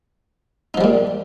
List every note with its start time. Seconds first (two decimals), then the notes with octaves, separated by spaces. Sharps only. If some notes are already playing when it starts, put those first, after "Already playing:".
0.74 D#4
0.77 F3
0.81 G3
0.84 A#2